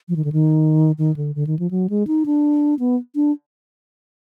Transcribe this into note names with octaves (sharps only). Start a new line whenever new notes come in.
F3
D#3
D3
D#3
D#3
D3
D3
D#3
F3
F#3
G#3
D#4
D4
B3
D4